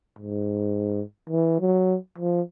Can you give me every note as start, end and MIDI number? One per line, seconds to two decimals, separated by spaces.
0.19 1.02 44
1.30 1.59 52
1.60 1.96 54
2.18 2.41 53